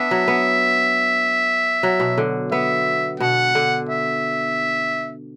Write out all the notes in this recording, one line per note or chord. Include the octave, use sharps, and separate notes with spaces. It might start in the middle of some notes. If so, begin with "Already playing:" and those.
Already playing: B3 D4 E5
F#3
B3
F#3
B2
D3
B3 E5
B2 F#5
D3
E5